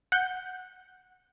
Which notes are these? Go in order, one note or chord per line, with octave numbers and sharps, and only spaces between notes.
F#5 G6